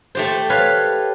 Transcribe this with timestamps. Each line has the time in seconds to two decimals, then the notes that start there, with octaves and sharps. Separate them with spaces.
0.15 A3 G4 C5
0.50 B4 C#5 F5